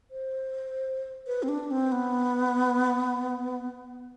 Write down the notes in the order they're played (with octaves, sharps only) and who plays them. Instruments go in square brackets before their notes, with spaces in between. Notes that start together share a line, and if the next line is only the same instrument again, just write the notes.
[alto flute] C5
B4
C4
D4
C4
B3